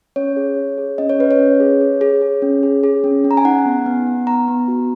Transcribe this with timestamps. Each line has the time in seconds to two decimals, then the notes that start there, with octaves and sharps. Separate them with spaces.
0.16 C#4 C#5
0.36 G#4
0.57 G#4
0.78 G#4
0.98 C#4 D#5
1.09 C#5
1.19 C#4 B4
1.31 C#5
1.39 C#4
1.60 G#4
1.81 G#4
2.01 G#4
2.21 G#4
2.42 C#4
2.63 G#4
2.83 G#4
3.04 C#4
3.24 C#4
3.31 A#5
3.37 G#5
3.45 D#4 F#5
3.66 B3
3.86 B3
4.07 B3
4.27 B3 A#5
4.48 B3
4.68 F#4